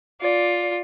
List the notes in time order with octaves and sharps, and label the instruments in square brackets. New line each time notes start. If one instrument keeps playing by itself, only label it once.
[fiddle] F4 [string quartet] D5